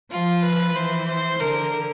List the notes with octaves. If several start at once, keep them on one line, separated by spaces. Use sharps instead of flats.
F3 F4
B4
E3 C5
C5
D3 A#4